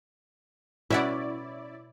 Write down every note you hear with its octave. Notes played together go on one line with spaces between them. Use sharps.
B2 C#4 E4 D5 E5 F#5